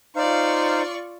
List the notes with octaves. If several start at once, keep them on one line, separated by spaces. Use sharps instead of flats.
D#4 F4 C5 D5 F5 C#6